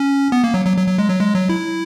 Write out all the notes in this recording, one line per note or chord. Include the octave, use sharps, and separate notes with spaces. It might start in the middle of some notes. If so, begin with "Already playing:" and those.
Already playing: C#4
B3
A#3
F#3
F#3
F#3
F#3
G#3
F#3
G#3
F#3
E4